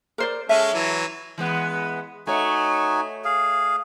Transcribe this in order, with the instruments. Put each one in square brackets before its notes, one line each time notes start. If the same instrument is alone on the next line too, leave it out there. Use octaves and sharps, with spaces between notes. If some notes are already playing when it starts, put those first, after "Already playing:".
[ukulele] A#4 C5 D5
[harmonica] G#3 C#4 A4 [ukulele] E5
[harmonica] E3 F#3
[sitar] E3 G#3 B3
[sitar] A3 C#5 [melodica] D#4 F#4 G#5
[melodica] G#4 F5